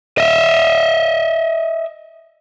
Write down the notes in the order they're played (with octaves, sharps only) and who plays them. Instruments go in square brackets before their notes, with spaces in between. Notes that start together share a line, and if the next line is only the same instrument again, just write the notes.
[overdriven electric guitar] D#5 E5